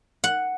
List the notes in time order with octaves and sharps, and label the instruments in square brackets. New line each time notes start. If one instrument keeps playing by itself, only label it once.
[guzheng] F#5